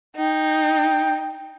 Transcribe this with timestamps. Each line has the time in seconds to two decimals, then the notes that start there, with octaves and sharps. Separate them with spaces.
0.16 D#4 G5